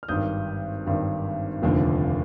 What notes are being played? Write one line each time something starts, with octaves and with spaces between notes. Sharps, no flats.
F6
G#1 G2 D#3 D#6 G6
G#1 G2 D#3
F1 D#2 D3 F3